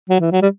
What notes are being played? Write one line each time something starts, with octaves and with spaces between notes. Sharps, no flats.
F#3
E3
F#3
G3